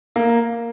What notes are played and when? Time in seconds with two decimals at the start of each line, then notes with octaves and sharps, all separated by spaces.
0.16 A#3